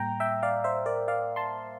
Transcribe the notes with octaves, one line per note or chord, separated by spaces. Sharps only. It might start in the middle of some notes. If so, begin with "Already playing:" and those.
Already playing: A2 G3 A#3 G5 A#5
E5 G5
D5 F5
C5 E5
A#4 D5
D5 F5
A5 C6